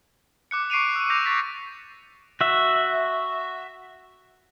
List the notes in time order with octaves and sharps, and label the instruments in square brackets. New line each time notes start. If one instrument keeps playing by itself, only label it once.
[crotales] D6 F#6 C#7
C#6 C7 D7 D#7 F7
E6
D6 E6 G6 A#6 C7 F7
C#6 A6 B6
[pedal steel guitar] F#4 E5